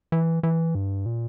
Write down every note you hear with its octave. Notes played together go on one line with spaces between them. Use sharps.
E3
E3
G2
A#2